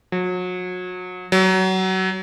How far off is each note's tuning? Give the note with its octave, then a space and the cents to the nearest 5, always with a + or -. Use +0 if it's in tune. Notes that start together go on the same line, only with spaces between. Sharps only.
F#3 -30
F#3 +25